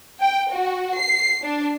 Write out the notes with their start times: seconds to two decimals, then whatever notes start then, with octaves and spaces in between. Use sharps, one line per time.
0.21 G5
0.52 F#4
1.00 C7
1.43 D4